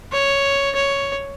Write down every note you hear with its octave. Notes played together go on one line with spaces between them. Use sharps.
C#5
C#5